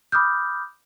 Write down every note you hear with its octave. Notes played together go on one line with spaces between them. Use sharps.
B5 D6 D#6 F6 G6